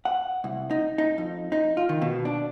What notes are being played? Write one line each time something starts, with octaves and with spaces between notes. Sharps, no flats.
F#5
C2
D#4
D#4
F2
D#4
F4
D#3
B2
D4